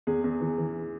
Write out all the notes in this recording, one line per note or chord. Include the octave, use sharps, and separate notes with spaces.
E2 G#4
E2
E3
E3